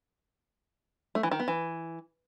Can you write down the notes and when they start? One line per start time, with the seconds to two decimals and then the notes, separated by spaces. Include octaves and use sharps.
1.15 A3
1.23 E3
1.31 D#3
1.40 B3
1.48 E3